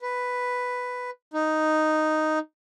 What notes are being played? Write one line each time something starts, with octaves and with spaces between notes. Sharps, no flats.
B4
D#4